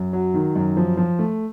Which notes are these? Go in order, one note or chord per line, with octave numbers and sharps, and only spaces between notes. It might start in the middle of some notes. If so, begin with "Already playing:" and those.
Already playing: F#2
F#3
D#3
F#2
F3
F3
A3